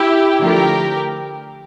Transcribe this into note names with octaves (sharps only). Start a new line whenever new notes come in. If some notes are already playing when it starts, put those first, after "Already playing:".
Already playing: E4 G4
D3 F3 A3 G4 A#4